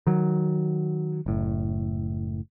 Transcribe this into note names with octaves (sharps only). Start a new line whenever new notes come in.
D#3 F#3
F#1 A2